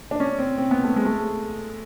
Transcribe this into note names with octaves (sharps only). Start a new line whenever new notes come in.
D4
C#4
C4
C4
B3
A3
G#3
A3